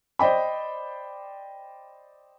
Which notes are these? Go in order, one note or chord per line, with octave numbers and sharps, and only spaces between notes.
C5 D5 D#5 G5 B5